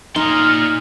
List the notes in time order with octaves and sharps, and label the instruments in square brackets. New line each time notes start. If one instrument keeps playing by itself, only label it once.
[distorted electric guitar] A#2 C6 [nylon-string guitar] D#4 [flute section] D#6 F6